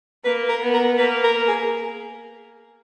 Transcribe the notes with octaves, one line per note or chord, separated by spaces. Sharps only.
A#3 B4
A#4
B3
A#4
A#3 B4
A#4
G#4